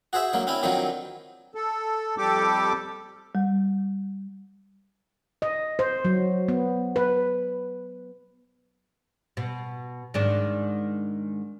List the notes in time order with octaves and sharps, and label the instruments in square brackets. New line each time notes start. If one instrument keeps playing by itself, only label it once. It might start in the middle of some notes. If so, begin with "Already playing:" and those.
[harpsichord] F#4 G#4 C5 E5
D3 F#3 A#3
C4 C#4 E4
D3 D#3 F3 F#3 C4
[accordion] A4
F2 G3 G4 A4 D6
[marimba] G3
[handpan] D#5
C5
F#3
B3
B4
[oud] B2
G#2 D#3 D4